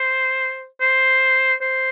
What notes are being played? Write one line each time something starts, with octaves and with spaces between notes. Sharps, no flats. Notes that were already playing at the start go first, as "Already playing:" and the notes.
Already playing: C5
C5
C5